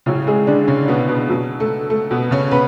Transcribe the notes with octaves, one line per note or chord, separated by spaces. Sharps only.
A2 C#3 F#3 C#4
G#3 G#4
D3 D4
C#3 C#4
B2 B3
B2 B3
B2 F#3
A3
A3
B2 B3
C#3 C#4
C#3 B3 B4